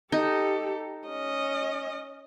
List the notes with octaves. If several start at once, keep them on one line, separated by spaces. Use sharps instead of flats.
D#4 G4 A4
C#4 D#5